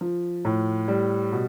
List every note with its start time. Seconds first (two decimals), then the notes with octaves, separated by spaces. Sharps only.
0.01 F3
0.45 A2
0.88 G3
1.32 B2